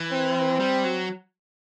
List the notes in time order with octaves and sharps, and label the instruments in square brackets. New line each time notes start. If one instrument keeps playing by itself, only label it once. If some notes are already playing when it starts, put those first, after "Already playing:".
Already playing: [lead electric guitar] E3
[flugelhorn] C4
[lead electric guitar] G3
F#3